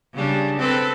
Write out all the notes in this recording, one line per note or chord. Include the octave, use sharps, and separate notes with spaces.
C#3 G3 D4
C4 A4 B4